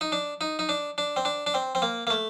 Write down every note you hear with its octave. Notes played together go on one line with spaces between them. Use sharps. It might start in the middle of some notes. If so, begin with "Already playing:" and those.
D#4
D4
D#4
D#4
D4
D4
C4
D4
D4
C4
C4
A#3
A#3
A3